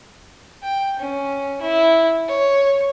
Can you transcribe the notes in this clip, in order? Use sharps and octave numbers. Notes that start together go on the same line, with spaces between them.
G5
C#4
E4
C#5